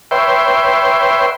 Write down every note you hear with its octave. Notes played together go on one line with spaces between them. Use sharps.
B4 C#5 E5 G5 C6